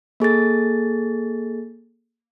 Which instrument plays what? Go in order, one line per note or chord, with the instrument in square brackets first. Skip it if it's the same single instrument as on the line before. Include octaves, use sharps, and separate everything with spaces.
[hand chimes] A#3 G#4 A4 A6